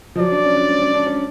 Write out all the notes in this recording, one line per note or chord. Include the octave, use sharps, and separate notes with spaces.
F3
F#3 D5
D4
C#4
D4
C#4
C#4
D4
C#4